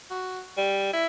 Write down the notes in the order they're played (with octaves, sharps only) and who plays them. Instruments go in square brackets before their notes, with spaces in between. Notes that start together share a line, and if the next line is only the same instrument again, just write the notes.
[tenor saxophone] F#4
G3
E4